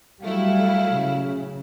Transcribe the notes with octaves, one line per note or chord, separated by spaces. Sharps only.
F#3 G3 A3 E4 F5
C#3